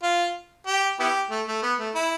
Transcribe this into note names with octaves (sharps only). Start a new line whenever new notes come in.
F4
G4
B3 E4 G4
A3
A3
B3
A3
E4